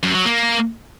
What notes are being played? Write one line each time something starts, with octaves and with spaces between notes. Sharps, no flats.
F#2
F#3
A#3